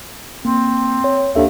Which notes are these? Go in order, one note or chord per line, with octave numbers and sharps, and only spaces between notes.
A#3 C4
C#5
D#2 D4 A4 E5